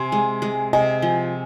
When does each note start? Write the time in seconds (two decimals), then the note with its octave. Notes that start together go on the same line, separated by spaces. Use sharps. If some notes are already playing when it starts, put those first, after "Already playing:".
Already playing: C3 G#5 C6
0.12 G#3
0.42 G#3
0.73 C3 D#5 G#5
1.02 F3